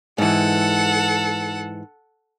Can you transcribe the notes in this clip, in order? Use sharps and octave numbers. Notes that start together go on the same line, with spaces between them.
G#2 E3 A4 F#5